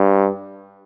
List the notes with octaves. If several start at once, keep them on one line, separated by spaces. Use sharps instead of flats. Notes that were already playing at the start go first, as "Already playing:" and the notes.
Already playing: G2